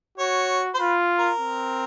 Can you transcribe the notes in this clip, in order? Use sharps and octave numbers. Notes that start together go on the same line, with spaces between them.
F#4 C#5
C5
F4 B4
A#4
C4